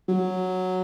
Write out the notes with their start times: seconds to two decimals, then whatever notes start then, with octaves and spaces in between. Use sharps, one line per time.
0.09 F#3